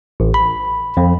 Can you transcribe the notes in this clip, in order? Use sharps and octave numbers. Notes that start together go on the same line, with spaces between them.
A1
B5
F2